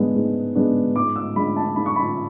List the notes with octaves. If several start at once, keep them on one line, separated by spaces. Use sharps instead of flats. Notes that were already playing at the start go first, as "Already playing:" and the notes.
Already playing: G#2 G#3 B3 D4
G#2
G#3 B3 D4
G#2 D6
E6
G#3 D4 B5
A5
G#2 B5
C#6
B5